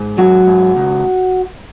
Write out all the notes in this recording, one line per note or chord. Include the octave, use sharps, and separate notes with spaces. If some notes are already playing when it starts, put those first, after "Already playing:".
Already playing: G#2
F#3 F#4
G#2
C#2